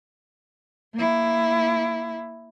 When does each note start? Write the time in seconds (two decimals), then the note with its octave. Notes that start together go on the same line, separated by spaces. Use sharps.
0.94 A#3 E4